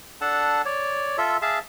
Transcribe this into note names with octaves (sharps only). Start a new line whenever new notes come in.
D4 A4 F#5 A5
C#5 D5
F4 A4 E5
G#4 E5 F5 A5